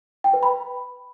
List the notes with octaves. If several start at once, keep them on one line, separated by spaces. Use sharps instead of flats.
G5
B4
B5